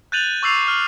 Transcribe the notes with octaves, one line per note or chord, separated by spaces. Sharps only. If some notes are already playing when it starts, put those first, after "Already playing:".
F#6 G6 A6 D#7 F7 F#7
C#6 D6 E6 A6 C7 F7
F6